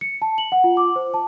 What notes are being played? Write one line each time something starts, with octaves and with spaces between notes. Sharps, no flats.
C#7
A5
F#7
F#5
F4
D6
C5
A5